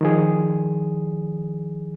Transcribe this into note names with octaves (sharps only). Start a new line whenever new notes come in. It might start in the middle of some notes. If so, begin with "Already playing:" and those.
D#3 F3 G#4